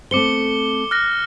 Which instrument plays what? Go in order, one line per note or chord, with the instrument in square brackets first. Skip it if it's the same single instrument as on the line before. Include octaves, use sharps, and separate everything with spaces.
[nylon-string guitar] A3 C4 C5 [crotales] D6 C#7 G7
[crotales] F6 F#6 A#6